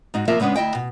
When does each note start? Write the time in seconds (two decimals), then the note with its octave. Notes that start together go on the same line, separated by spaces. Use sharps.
0.14 G#2 D#4 F#4
0.28 C3 F3 A#3 F4 A#4 E5
0.40 C#3 G#3 B3 C#4 D4
0.55 D2 E4 D#5 G5
0.75 B2